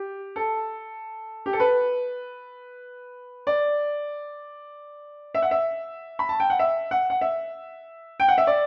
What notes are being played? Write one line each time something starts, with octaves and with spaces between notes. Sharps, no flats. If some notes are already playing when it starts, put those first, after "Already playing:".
Already playing: G4
A4
G4
A4
B4
D5
E5
F#5
E5
B5
A5
G5
F#5
E5
F#5
F#5
E5
G5
F#5
E5
D5